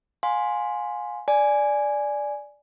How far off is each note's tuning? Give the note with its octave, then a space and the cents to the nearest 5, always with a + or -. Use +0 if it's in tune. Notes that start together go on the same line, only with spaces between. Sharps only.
F5 +30 G#5 +0 C6 +0
D5 +0 G#5 +5